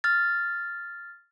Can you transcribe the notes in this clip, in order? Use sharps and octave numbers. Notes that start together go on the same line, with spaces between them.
F6 A6